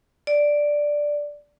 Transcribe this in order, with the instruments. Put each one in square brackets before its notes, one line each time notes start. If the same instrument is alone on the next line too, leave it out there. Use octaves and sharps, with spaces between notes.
[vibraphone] D5